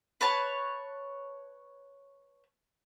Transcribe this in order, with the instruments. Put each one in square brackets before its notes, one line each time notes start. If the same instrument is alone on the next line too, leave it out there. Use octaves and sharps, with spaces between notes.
[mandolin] B4 C#5 A5